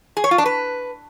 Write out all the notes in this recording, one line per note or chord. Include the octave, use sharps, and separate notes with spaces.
G#4
C#5
F4
D4
B4